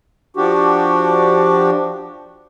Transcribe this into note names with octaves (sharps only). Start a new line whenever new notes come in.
F3 D4 F#4 G4